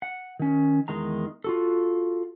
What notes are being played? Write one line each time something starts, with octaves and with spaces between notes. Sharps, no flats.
F#5
D#3 C#4
E2 D#3 G#3 A#5
F4 F#4 A4